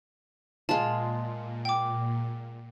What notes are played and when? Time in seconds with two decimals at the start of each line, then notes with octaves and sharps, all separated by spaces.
0.69 A#2 G#3 F4 A5
1.65 G5 D6